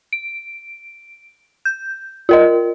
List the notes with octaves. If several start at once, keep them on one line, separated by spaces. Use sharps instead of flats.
D7
G6
F4 A#4 D#5